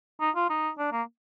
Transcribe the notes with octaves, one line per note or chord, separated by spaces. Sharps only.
D#4
F4
D#4
D4
A#3